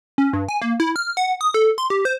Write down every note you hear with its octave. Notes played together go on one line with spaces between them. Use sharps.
C#4
G2
G#5
A#3
E4
F6
F#5
D#6
A4
C6
G4
C5